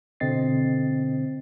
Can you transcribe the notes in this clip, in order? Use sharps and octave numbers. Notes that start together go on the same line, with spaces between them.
B2 D3 C4 D#5 A6 C7